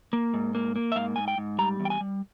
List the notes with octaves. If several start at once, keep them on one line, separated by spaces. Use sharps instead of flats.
A#3
G#2
A#3
A#3
E5
G#2 F5
G#2 G#5
G5
G#2
G3 A#5
E2
G5
G#5
G3